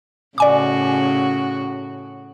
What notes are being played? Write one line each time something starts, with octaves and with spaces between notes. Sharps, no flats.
A2 C#3 F#4 D5 G#5 D6